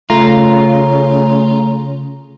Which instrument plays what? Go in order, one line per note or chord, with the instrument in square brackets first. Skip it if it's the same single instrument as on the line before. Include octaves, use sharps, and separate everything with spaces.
[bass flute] C#3 [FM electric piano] A3 A#5 [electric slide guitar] F4